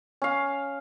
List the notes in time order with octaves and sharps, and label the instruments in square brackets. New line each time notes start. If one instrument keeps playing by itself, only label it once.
[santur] C#4 F5